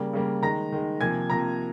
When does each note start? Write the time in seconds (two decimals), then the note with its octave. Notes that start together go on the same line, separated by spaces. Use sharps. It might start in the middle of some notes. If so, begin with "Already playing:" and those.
Already playing: C#3 G3 A#3
0.13 C#3 G3 A#3
0.42 D#3 G#3 A#5 A#6
0.72 D#3 G#3
1.01 C3 F3 A#3 G#5 G#6
1.30 C3 F3 A#3 A#5 A#6